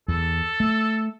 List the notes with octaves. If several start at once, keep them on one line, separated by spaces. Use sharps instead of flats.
E2 A4
A3